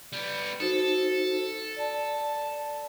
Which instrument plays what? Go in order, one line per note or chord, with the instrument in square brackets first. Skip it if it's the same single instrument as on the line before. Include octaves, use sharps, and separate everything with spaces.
[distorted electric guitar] G3 B3
[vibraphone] D#4 F#4 C5 [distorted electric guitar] A4
[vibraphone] D5 A5